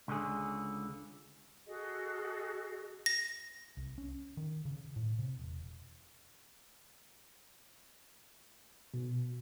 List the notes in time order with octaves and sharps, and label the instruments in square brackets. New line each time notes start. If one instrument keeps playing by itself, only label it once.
[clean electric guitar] C#2 D3 G#4
[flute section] F#4 G#4 A4 D#5
[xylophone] A#6
[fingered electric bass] C2
C#4
D#3
C#3
A2
C3
E1
[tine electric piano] B2